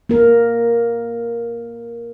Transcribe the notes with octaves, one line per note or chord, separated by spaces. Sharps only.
A#3 A#4